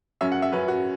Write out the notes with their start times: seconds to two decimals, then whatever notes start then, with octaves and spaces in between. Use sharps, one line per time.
0.21 F#2 F#3 C#4 E5
0.32 F#5
0.42 E5
0.52 F#2 F#3 C#4 B4
0.68 F#4